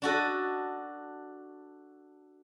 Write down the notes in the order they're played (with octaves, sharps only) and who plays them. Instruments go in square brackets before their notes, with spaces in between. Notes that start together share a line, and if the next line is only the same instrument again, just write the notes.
[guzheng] D4 F#4 A4 D#5